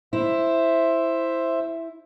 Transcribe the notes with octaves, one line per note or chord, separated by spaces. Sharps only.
E4 C5 E5